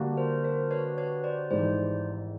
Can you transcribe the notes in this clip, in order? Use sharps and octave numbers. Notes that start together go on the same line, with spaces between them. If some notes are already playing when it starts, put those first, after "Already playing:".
Already playing: D3 G3 A#3 D4 F#4
A#4 C5
A#4 C5
B4 C#5
B4 C#5
C5 D5
G#1 G#2 E3 G3 C4 C5 D5